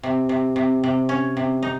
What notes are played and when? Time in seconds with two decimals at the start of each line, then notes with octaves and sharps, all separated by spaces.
0.03 C3
0.29 C3
0.56 C3
0.84 C3
1.09 C#4
1.37 C3
1.63 D#4